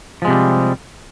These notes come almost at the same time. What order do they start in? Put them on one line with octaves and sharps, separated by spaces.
F3 G#3 C3 G3